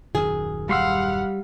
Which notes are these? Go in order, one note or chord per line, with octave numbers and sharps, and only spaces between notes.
D#1 F#2 D#3 G#4
G3 F5 F#5 C6 E6